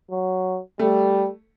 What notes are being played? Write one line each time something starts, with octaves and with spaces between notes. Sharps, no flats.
F#3
G3 A3